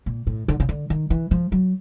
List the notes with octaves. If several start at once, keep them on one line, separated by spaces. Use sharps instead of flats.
A#2
A2
D3
C#3
D3
D#3
E3
F3
F#3